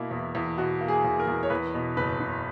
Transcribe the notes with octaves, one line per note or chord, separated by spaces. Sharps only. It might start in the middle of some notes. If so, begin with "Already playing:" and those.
Already playing: B2 A#3 E4
E2
E2
B2 F#4
A#3
G#4
E2
A#4
E2
C#5
E2 B4
B2
F#1 B4
F#1